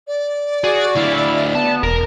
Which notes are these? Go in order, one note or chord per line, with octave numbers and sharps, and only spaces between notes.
D5
F#4 G#4
D2 E4 F5
B3 A5
E1 A#4